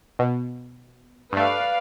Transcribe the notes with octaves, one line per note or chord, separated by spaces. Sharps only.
B2
G2 A3 B4 D5 F5